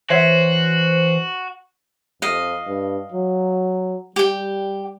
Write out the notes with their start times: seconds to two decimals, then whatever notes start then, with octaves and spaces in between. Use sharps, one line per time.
0.10 E3 F#4 C5 C#5 E5 F#5
2.22 F2 D#5 F5
2.67 G2
3.12 F#3
4.16 G3 G4 G5